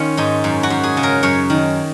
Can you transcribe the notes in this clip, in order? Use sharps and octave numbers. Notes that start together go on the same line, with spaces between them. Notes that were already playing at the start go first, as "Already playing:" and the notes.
Already playing: D#3 C#4 F4
G#2 D#4
F#2
F#4
F#2
G#4
C#3
A#4
F#2 C#5
D#3